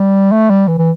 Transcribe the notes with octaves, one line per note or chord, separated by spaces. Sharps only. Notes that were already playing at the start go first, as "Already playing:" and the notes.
Already playing: G3
A3
G3
E3
E3